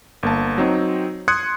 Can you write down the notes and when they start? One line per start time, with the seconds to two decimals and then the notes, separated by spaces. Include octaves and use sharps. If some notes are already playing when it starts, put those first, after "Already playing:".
0.23 G1 A#3 A5
0.58 F#3 C4 D#4
1.28 C6 D#6 F#6 G#6 C#7